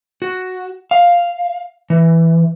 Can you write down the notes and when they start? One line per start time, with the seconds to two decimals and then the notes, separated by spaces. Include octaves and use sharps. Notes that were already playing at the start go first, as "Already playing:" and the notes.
0.22 F#4
0.91 F5
1.90 E3